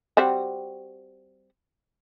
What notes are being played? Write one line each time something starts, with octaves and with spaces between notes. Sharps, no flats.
G3 C4 F#4